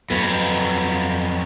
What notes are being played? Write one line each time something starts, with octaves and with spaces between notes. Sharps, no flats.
F2 F#3 B3